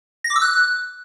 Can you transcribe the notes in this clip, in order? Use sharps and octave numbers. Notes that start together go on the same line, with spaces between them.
A#6
D6
E6
F#6